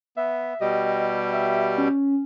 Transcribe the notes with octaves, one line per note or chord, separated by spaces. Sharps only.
B3 E5
B2 G3 G4 D#5
E5
C#4